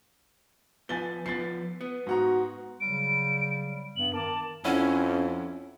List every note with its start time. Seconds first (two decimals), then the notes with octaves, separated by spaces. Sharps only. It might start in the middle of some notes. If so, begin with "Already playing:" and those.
0.89 F3 B3 G#5 A6 G7
1.26 F3 B3 A6 C7
1.81 B3
2.07 G#2 F#4 F#5 A#5
2.81 C#3 F#3 G3 D7
3.96 G2 B3 F#7
4.14 D#3 A#4 A5 D6
4.65 F2 C#4 E4 C#5 F#5